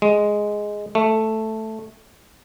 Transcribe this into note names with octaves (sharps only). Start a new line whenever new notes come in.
G#3
A3